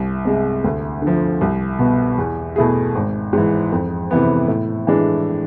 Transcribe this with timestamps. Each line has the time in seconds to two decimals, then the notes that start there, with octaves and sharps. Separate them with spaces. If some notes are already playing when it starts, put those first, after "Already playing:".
Already playing: C2
0.25 C3 G#3
0.64 D2
1.02 D3 F3
1.41 C2
1.79 B2 B3
2.18 E2
2.56 B2 A3 E4 G#4
2.95 G#1
3.33 G#2 E3
3.72 F2
4.11 C3 E3 B3
4.48 A2
4.87 E3 G#3 D4